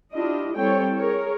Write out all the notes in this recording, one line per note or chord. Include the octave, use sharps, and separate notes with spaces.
D4 E4 F4 G4 D#5
G3 C4 E4 A4 C#5 G5
G#4 A#4 C#5